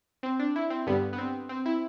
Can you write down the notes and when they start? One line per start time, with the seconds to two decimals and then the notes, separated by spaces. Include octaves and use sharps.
0.23 C4
0.40 D4
0.56 E4
0.70 C4
0.87 G2 D3 G3 B3
1.13 B3
1.18 C4
1.49 C4
1.66 E4